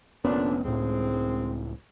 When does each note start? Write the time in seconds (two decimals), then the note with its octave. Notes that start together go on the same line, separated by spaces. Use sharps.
0.25 F1 A#2 D3 B3 C#4 D4
0.64 C#2 A2 D#3 G#3 C4